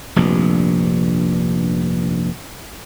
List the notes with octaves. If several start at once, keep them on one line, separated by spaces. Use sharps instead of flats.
F1 A#1 G2